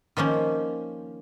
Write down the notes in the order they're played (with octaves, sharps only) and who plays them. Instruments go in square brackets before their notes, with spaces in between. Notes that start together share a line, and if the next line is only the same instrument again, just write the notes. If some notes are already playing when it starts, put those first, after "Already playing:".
[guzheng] D#3 F3 A#3 C#4